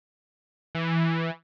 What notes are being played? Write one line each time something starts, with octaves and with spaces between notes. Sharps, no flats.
E3